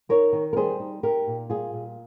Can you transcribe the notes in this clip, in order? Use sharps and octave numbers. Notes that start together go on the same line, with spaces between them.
D#4 A#4 C#5
D#3
A#4
G3 G#4 C5
D#4
D#4 G4 A#4
A#2
G3 F4 G#4
A#2